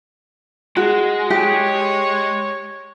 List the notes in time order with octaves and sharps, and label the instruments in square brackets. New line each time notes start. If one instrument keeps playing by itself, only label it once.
[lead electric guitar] G#3 [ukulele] F#4
[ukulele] G4 [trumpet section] C#5